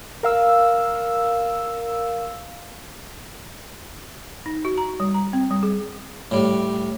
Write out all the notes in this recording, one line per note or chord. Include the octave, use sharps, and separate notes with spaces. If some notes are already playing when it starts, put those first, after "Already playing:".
A#4 F5 E6
D#4
F#4
A#5
G3
A#5
C4
G3
G#4
A2 G3